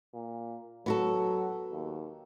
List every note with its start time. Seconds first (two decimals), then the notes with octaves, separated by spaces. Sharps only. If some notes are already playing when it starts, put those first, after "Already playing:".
0.14 A#2
0.86 F#3 B3 F#4 A4
1.72 D#2